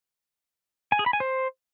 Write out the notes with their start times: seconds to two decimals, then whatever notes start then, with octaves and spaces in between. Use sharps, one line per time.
0.92 G#5
0.99 G#4
1.06 B5
1.13 G#5
1.20 C5